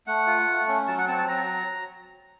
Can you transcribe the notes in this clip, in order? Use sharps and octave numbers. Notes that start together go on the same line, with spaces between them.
A3 F#5
F4
A3
C#4
F#3 A5
F#5
C4 A5
A5
F#3 A#5